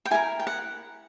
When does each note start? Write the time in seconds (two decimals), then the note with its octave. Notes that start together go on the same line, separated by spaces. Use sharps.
0.05 G5
0.11 E4 G4 A#4 G#5
0.39 G5
0.47 F#5